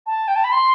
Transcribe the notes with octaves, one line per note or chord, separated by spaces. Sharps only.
A5
G5
A5
B5
C6